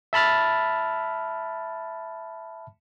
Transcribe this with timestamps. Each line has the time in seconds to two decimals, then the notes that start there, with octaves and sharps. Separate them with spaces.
0.13 E5 A5 B5 F6 A6